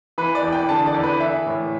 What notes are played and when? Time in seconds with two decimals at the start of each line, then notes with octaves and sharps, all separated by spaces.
0.18 E3 B4
0.35 D5
0.43 E2
0.52 G5
0.69 D3 A5
0.86 D5
0.95 E2
1.03 B4
1.20 E3 E5
1.46 A2